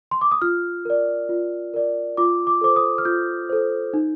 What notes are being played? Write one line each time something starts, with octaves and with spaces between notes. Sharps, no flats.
C6
D6
D#6
F4 F6
A#4 D5
F4
A#4 D5
F4 D6
D6
A4 C5 D6
D#6
F6
F4 G6
A4 C5
D#4